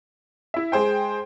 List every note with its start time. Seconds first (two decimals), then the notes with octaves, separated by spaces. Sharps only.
0.54 E4 E5
0.72 G#3 G#4 C5 G5